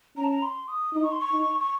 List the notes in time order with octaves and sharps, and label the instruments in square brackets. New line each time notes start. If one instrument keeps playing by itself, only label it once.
[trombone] C#4 [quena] A#5
[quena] A5
A#5
C6
D#6
[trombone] D#4 [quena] D#6
[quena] C#6
C6
C#6
[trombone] D#4
[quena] C#6